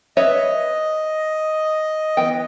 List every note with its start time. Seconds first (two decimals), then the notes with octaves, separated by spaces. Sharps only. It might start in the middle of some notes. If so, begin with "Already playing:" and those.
0.17 B4 C#5 D#5 E5
2.17 E3 B3 G5